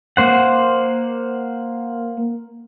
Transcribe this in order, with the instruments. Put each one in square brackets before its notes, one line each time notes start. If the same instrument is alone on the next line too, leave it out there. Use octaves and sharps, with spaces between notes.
[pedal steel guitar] A#3 C5 F#5